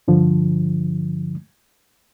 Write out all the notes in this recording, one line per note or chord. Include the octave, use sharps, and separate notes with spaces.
G2 D3 F3